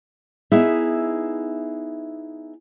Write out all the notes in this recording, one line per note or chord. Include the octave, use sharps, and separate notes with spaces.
B3 D#4 E4 G#4 E5